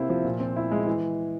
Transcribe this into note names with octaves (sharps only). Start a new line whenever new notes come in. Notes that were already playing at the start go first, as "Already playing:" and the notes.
Already playing: C3 A#3 C4 E4
F3
A#2
C4
E4
G#3
E3